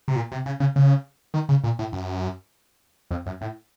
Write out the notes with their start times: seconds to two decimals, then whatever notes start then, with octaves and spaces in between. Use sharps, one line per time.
0.08 C3
0.16 A#2
0.32 C3
0.46 C#3
0.60 C#3
0.76 C#3
1.34 D#3
1.49 C#3
1.64 A#2
1.79 A2
1.92 F#2
3.11 F2
3.26 F#2
3.41 A2